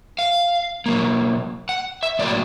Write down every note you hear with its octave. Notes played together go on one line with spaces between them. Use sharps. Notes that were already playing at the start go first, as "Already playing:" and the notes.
F5
B2 F#3 A#3
F#5
E5
A2 F#3 A#3 D5